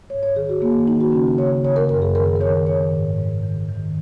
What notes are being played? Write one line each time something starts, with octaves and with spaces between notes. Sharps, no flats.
G#2 C#5
C#5
D#3 G#4
F#4
D#3 A#3
D#3 D#4
F#4
C#3 C#4
C#3 C#5
C#3 C#5
A#4
F#2 A#4
G#4
D#3 A#4
A#4
D#3 C#5
D#3 C#5
G#2
G#2
D#3
D#3